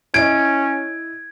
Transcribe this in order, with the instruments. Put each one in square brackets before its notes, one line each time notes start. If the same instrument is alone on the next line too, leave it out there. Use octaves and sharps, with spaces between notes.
[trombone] C#4 [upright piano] E4 D#5 [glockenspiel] G#6 [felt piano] D7